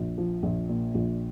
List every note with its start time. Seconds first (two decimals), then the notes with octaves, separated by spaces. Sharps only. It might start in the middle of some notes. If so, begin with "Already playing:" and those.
Already playing: A#1
0.18 F3
0.43 A#1
0.69 A#2
0.95 A#1